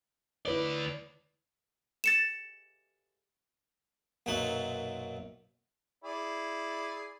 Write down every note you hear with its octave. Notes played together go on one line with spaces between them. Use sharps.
D2 E4 B4 C#5 D5
A6 C#7 E7
B1 F#2 A#2 F#3 D#4 F#5
E4 G#4 D5